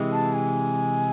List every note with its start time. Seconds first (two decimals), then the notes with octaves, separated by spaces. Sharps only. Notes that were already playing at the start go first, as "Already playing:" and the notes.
Already playing: C3 E3 G#3
0.12 A5
0.34 G#5